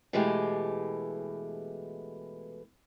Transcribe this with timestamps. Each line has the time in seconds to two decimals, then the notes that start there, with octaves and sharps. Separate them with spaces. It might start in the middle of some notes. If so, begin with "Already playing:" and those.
0.13 B2 E3 G#3 A3 G4